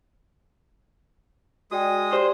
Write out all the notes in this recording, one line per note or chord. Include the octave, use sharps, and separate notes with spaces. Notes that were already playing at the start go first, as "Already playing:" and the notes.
G#3 F#4 D5 G5 D#6
G4 C5 D5